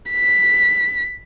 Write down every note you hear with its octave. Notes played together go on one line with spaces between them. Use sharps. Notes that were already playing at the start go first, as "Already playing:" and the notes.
B6